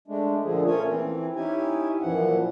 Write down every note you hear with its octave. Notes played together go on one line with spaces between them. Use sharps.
G#3 A3 D4
A#2 D3 F3 G#4
A3 A#3 C#4 F4 C#5 G#5
E3 C4
C#4 D#4 E4 G4 G#5
F#2 A#2 E3 F3 F#5